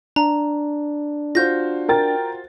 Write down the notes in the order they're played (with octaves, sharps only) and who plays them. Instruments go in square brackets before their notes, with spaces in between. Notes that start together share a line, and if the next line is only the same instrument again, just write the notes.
[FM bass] D4 [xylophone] A#5
[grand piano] F4 F#4 C5 [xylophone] G6 A#6
[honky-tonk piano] A#4 G5 A6